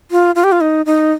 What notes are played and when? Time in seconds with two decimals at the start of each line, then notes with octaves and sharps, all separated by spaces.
0.11 F4
0.35 F4
0.44 G4
0.52 F4
0.61 D#4
0.86 D#4